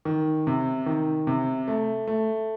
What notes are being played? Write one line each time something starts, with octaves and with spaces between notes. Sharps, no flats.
D#3
C3
D#3
C3
A3
A3